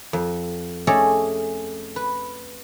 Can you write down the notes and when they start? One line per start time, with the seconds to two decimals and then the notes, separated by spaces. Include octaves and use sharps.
0.13 F2
0.87 A3 C#4 G#4 A4 D5 D#5
1.96 B4